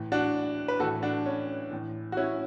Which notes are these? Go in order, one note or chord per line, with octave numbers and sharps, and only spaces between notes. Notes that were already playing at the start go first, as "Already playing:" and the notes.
Already playing: A2 E3
D4 F#4
B4
A2 E3 F#4 A4
D4 F#4
C#4
A2 E3
F#4
C#4 E4